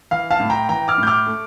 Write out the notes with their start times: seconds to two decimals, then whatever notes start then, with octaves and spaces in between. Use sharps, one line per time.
0.11 E3 F5
0.31 F5 A5
0.40 A2
0.50 G5 A#5
0.69 E3 G5 A#5
0.88 D6 F6
0.98 A2 G6
1.07 D6 F6
1.26 A3